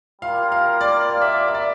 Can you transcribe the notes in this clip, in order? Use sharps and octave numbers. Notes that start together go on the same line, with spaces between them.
G3 A#3 F4 A#4 F5
F5
D5
D5
E5
D5
E5
D5